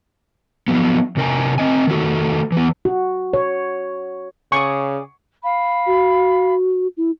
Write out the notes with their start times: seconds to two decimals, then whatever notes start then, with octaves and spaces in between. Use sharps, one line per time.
0.68 F3 F#3 B3
1.17 C3 C#4 A#4 C#5 G5 G#5
1.58 C4 D#5 G#5
1.87 D#3 A3 F#4 A4
2.52 E3 B3
2.85 F#4
3.33 C#5
4.52 C#3 G#4 D5 C#6 D#6
5.43 F5 B5
5.87 F#4
6.97 E4